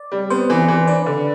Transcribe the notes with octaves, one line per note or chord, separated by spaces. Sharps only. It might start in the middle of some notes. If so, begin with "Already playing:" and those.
Already playing: D5
G3
B3 C5
E3
E3
D4 B4
D3